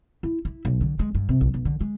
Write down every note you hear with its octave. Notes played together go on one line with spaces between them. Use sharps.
E4
E4
B1
D3
G#3
G2
C3
B1
B1
D3
G#3